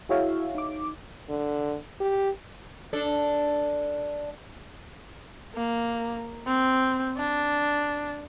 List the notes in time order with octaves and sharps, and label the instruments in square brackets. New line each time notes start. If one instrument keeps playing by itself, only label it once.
[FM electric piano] E4 F#4 G#4 C#5 E5 F5
D#4 D6
[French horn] D3
G4
[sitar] D4 A4
[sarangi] A#3
C4
D4